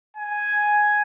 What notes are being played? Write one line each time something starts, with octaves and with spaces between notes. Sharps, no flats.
G#5